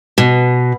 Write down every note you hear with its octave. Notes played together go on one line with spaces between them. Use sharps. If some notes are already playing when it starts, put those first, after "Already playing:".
B2